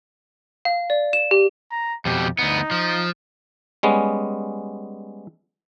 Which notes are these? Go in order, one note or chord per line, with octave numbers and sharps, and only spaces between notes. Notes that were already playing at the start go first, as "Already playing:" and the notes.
F5
D5
E7
G4
A#5
F2 B2 G4
D2 B3 D#4
F3
G3 G#3 B3 C#4